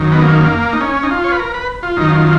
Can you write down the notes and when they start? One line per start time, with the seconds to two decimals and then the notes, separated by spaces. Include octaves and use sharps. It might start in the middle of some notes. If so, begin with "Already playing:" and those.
Already playing: F#2 D#3
0.12 B3
0.22 A#3
0.73 D#4
0.81 C#4
1.03 D#4
1.11 F4
1.24 C#5
1.32 B4
1.39 A#4
1.54 B4
1.83 F4
1.97 F#2 D#3 D#4
2.10 F4